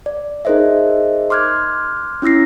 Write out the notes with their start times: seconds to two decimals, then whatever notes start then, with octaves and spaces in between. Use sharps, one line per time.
0.06 D5
0.45 D#4 G#4 A#4 C5 D#5 E5
1.30 C6 D6 F6 F#6 G#6
2.22 C#4 E4 E6 A#6 C7